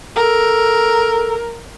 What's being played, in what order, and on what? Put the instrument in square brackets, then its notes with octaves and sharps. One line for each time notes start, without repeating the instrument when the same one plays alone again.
[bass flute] A4 [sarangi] A#4